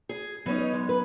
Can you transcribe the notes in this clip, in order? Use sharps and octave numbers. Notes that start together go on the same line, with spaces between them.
G#4
E3 F#3 B3 C#4 D#4
B4 D#5
G#3
D#4 A#4 B4